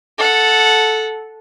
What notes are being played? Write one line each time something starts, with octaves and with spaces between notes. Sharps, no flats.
A4 F#5